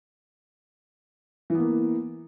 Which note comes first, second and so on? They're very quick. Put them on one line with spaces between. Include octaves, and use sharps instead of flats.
E3 B3 A#3